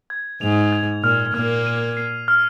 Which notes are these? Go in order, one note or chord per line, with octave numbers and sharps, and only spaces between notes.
G#6
G#2 F7
G#6
A#2 F6
A#2 A#3 F6
D#7
C7
F6